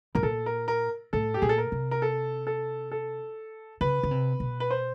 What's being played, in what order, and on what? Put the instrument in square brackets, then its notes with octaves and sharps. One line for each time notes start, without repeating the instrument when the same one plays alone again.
[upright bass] A2 [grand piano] A#4
[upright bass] A#2 [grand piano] A4
[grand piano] A#4
A#4
[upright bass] A2 [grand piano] A4
[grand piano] G4
[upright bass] A#2 [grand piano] G#4
[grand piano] A4
A#4
[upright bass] C3
[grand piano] A#4
A4
A4
A4
[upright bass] C#3 [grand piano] B4
[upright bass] C#3
C3
B2
[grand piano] B4
C5